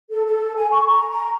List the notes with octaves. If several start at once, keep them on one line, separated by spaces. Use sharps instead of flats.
A4
A4
G#5
C#6
A#5
A#5